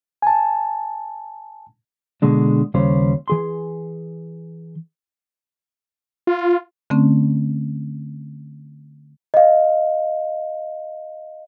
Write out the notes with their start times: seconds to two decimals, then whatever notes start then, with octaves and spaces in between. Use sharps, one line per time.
0.22 G#5 A5
2.22 B2 D3 G#3 D4
2.74 D#2 C#3 G3 C5 C#5
3.28 E3 G#4 C6
6.27 F4
6.90 D3 A3 C4 C#4
9.34 D#5 F5